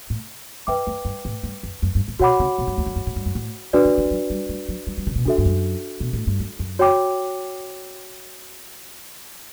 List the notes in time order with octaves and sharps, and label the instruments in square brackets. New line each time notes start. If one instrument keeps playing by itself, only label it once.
[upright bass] A2
[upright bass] F#2 [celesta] B4 E5 G5 D6
[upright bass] F#2
G2
A2
G2
F#2
F#2
G2
A2
[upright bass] B2 [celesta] F#4 C#5 F#5 B5 D6
[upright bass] C#3
B2
G2
E2
F#2
G2
A2
G2
F#2
A2
[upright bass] B2 [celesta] D4 F#4 B4 D5
[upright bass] D3
E3
G3
F#3
G3
G3
F#3
G3
G3
C#3
B2
[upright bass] C#3 [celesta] D4 F#4 A4 E5
[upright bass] G2
F#2
B2
A2
G2
F#2
F#2
[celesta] F#4 C#5 G5 D6